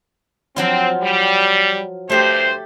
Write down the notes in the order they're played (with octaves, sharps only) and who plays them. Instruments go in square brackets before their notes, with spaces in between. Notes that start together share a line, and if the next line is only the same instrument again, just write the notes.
[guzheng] F3 F#3 F4 [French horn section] C4
[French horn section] G3
[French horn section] D2 G2 C5 [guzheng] A3 G4